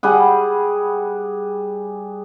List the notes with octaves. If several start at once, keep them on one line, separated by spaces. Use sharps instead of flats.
G3 G#4 F#5